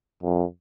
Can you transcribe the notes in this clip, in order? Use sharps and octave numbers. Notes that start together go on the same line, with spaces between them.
F2